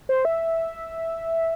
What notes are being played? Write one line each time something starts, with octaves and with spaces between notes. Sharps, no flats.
C5
E5